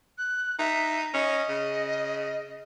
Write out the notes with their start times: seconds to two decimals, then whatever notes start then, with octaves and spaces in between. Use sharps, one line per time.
0.18 F#6
0.59 D#4 E5
1.14 C#4 D#5
1.49 C#3